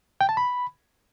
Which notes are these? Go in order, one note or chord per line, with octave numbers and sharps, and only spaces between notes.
G5
A5
B5